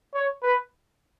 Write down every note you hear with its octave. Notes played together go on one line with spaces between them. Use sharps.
C#5
B4